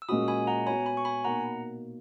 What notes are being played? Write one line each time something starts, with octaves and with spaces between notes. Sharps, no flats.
E6
A#2 G#3 C#4 F#4 B5 D#6
G#5 B5
F#5 A#5
B3 F#4 C#5 G#5 B5
G#5 B5
C#6
G#5 B5
B2 A#3 D#4 F#5 A#5